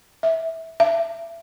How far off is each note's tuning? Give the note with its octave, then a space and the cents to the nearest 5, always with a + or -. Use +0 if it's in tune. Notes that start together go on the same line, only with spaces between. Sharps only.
E5 -15
E5 +25